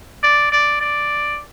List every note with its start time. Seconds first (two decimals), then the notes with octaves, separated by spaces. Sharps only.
0.23 D5
0.52 D5
0.81 D5